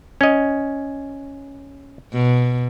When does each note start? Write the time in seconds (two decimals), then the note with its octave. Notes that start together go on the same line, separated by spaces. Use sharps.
0.21 C#4 D#5
2.13 B2